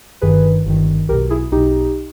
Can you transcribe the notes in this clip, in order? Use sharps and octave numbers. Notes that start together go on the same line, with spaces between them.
G1 G2 D#3 G#4 B4
G1 G2 D#3
B1 B2 G4 A#4
E4 G#4
B1 B2 D#4 G4